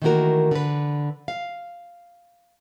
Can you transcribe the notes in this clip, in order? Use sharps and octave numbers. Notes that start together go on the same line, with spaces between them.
D#3 E3 A3 A#3 F#4 A#4
D3 B4
F5